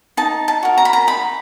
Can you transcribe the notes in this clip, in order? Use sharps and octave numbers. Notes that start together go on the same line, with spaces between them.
D#4 A5
A5
F#4 A#4
A#5
B5
A#5
D#4 B5